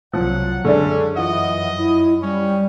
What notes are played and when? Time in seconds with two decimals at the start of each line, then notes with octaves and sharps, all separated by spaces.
0.13 C2 F3 F#3 F#5
0.65 F#2 D3 G#3 C#4 D4
1.16 E3 F4 D#5 F#5
1.78 E4
2.22 G3 C#4